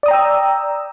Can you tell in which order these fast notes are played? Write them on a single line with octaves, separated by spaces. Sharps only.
D5 D#6 A#5 G5 E6